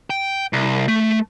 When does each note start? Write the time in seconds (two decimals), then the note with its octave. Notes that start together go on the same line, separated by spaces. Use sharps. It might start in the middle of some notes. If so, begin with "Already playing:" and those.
0.10 G5
0.53 C2
0.88 A3